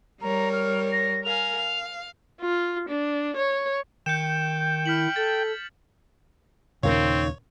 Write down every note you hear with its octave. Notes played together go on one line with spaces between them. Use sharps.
G3 A#4 C#5 A#5
F6
A#6
A#4 F5 G#5 F7
F5
F4
D4
C#5
D#3 G5 G6 C#7 E7
E4 F6 B6 F#7
A4 A6
D#2 A#2 C#3 C4 D#4 A#4 C#5 F5